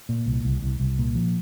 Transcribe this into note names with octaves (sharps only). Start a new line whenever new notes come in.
A#2
C2
C2
C2
C2
A#2
F3